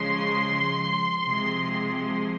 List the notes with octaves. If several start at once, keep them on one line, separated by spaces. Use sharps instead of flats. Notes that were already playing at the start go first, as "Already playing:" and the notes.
Already playing: C#3 F3 G#3 C6
C3 F3 G#3